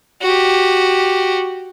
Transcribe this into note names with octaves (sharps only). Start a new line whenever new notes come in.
F#4 G4